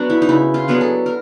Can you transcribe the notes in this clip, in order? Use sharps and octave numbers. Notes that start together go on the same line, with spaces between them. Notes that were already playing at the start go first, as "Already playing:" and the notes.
Already playing: F#3 B3 D4 F#4
E4
D#4
C#3 E4
F4
F#3 B3 D4 G#4
A4
A#4